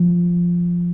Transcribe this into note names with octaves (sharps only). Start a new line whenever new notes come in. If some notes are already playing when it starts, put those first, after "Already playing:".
Already playing: F3